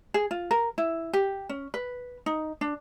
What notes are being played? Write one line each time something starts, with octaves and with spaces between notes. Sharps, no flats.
G#4
F4
A#4
E4
G4
C#4
B4
D#4
D4